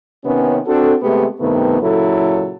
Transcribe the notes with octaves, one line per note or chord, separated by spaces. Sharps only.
C3 D#3 B3 C#4
C4 D4 F#4 A4
C3 G#3 A3 B3 G4
G2 C3 D#3 A3 B3
A#2 C#3 F#3 E4 A4